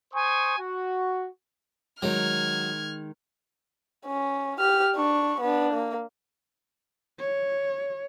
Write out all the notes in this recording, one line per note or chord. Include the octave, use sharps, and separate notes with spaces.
C5 G#5 C#6 D#6
F#4
D#3 F#3 G#3 F6 G#6
C#4
G4 F6
D4 C#6
B3 D4
A#3
C#5